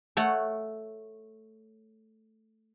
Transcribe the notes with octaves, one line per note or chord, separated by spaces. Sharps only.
A3 C#5 F#5